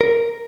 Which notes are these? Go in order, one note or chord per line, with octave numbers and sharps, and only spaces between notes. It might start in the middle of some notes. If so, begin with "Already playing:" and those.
A#4